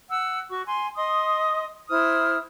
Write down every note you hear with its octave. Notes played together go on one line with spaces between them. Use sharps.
F#5 E6
F#4 C#6
G#5 C6
D#5 C6 D#6
E4 C5 D#6 F6